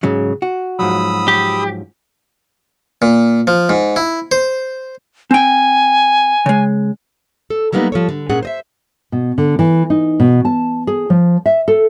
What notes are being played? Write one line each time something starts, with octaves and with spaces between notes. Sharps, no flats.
G#2 C#3 F#3
F#4
G#2 F3 F#3 B5 D#6 E6
G4
A#2
F3
G#2
E4
C5
C4 G5 G#5
C#3 G#3
A4
F#3 G3 A#3 B3 D#4
F3 A4 C#5
D3
A#2 C#4 G#4 F#5
C5 D#5 E5
B2
D3
E3
D#4
B2
A5
G#4
F3
E5
A4